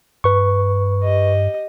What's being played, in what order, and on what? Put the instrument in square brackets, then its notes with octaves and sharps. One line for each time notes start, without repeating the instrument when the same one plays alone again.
[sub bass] G2 [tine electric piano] B4 C#6
[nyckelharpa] G4 D#5